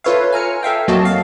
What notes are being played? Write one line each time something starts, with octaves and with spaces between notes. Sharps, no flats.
F4 A4 B4 C#5 E5 F5
G#5 A#5 F6 C#7
A4 E5 F5 G5
F2 F#3 A#3 F#4 D#5 A5
F5